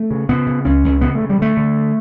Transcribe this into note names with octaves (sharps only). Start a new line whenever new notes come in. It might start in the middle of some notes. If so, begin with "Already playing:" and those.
Already playing: A3
C#3
C#3 B3
C#3
C#2 C#4
C#2
C#3 B3
A3
C#3
G3
D3 A3
D3